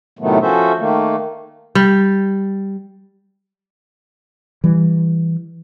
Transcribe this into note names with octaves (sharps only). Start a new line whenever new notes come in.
A2 C3 D#3 F#3 A3 B3
F3 C#4 F#4 A4 C5 E5
D#3 A3 A#3
G3
E3 G3